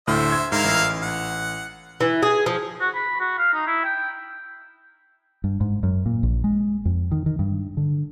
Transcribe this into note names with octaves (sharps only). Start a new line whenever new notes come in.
D2 A2 C5 E5 F6
G#6
G#2 E4 A#4 F5
A1
F#5
E3
G#4
F3
F#4
B5
F#4
F5
D#4
E4
G5
G2
G#2
F#2
A#2
A#1
G#3
F2
D#3
D#3
G2
D3